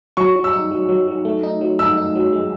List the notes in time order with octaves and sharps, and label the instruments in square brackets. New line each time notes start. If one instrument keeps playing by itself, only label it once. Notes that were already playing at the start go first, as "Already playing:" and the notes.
[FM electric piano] F#3 [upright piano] C#6
[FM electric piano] F#3
[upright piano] E6
[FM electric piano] D#4
F#3
F#3
F#3
A3
D#4
F#3
[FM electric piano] D#4 [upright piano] E6
[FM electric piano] D#4
F#3
G#3